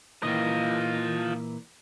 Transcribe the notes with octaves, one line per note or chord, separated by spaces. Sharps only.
A#2 E3 F4 D#5